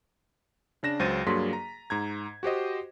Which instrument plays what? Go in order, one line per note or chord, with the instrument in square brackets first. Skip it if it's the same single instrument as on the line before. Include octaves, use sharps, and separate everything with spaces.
[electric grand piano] C#3 D4 A#6 E7
C#2 F#3 C5 A6 D#7
G2 F#3 A#3 G#4 C6 B6
A#5
G#2 A#5 G#6
F#4 G4 C5 D#5